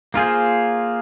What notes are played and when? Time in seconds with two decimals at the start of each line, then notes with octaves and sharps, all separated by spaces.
0.14 A#3 F4 G#4 C5